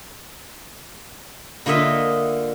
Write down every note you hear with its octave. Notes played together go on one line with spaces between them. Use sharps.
D3 A#3 F4 D#5 E5